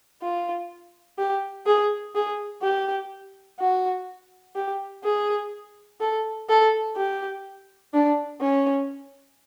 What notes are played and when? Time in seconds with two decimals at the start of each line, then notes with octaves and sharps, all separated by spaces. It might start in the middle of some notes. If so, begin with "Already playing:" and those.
0.22 F4
1.18 G4
1.67 G#4
2.15 G#4
2.62 G4
3.59 F#4
4.56 G4
5.04 G#4
6.00 A4
6.49 A4
6.96 G4
7.93 D4
8.41 C#4